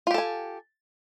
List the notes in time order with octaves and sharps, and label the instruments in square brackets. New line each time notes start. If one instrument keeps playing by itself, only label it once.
[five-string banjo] F4
G4
A4
G#5